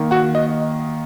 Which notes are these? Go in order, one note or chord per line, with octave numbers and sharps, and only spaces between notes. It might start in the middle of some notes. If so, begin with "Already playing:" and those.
Already playing: D#3 A#3
F#4 F#5
D#5